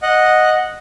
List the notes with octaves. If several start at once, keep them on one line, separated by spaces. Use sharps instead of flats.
D#5 F#5